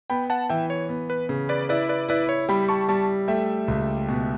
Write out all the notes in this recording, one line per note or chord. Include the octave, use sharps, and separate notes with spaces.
B3 G5 B5
F#5 A5
E3 E5 G5
C#5
B3
B4
C#3
B4 D5
E4 B4 D5
B4 D5
E4 B4 D5
C#5
G3 G5 B5
A5 C#6
G3 A5 C#6
A3 E5 G5
C#2
B2